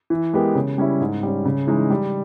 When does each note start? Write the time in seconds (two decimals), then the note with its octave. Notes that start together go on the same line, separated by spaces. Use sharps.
0.10 E3
0.33 G#3 B3 G4 A#4
0.55 C#3
0.78 G3 C#4 E4
1.01 G#2
1.23 G3 C#4
1.45 C#3
1.67 E3 G#3 D#4
1.90 G3